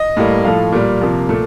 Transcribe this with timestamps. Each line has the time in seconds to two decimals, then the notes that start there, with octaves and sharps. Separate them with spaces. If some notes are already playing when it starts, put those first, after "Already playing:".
Already playing: D#5
0.16 A2 G3 A#3
0.45 A2 F3 A3 F5
0.72 A#2 G3 A#3
1.01 C3 F3 A#3
1.29 A#2 A3